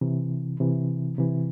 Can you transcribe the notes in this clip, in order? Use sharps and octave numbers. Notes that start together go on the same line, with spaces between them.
C3 E3
C3 E3
C3 E3